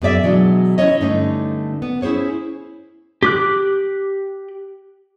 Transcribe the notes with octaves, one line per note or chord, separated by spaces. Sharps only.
F#2 B3 G#4 D5 E5
B2 E3 F#3 G#3 D4
C#4 E4 F4 C#5 D#5
G2 D3 A3 C#4 D#4
B3
C#4 E4 G#4 C5 C#5
G4 D6 F#6